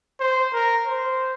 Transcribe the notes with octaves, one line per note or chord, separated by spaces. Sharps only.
C5
A#4
C5